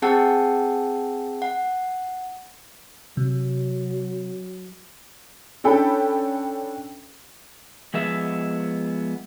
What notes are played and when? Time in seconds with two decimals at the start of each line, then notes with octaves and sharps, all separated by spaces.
0.02 C4 G#4 F#5 G5 A5 E6
1.42 F#5
3.17 C3 F#3
5.64 C#4 D4 A4 G5 B5
7.94 F3 G#3 B3 E5